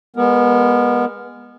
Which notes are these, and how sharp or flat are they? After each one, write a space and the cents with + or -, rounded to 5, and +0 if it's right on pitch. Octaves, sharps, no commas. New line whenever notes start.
G#3 -25 B3 -20 A#4 +0